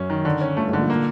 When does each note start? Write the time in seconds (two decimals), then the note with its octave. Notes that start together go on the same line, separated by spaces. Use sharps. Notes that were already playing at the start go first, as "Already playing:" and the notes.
Already playing: F#2 C#4
0.10 D#3
0.25 D3
0.41 C#4
0.57 G1 G2 A3
0.68 G#1 G#2
0.73 D3
0.78 A#1 A#2
0.89 A#2 A#3